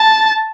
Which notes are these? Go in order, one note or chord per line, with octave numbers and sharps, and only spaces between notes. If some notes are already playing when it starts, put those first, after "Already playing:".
Already playing: A5